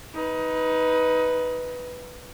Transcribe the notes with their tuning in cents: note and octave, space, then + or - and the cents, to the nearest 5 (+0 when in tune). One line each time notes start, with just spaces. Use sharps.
D#4 +20 B4 +0